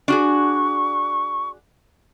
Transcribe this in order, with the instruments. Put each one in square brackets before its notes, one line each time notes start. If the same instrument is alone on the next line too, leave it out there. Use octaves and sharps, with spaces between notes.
[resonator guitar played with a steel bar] D4 F#4 G#4 [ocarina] C#6